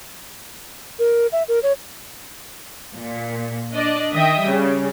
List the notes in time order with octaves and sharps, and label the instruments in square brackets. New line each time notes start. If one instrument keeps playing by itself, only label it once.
[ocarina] A#4
E5
A#4
C#5
[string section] A#2
D4 D5 D#5
D#3 D#5 E5 G5 D#6
C#3 G3